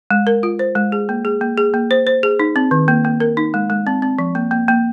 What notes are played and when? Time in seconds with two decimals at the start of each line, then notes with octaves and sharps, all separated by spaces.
0.10 G#3
0.27 A#4
0.43 F4
0.59 C5
0.75 G#3
0.92 G#4
1.09 A#3
1.25 G#4
1.41 A#3
1.58 G#4
1.74 A#3
1.91 C5
2.07 C5
2.23 G#4
2.39 D#4
2.56 C4
2.71 D#3
2.88 A#3
3.05 A#3
3.20 A#4
3.37 D#4
3.54 G#3
3.70 G#3
3.87 C4
4.02 C4
4.19 F3
4.35 A#3
4.51 A#3
4.68 A#3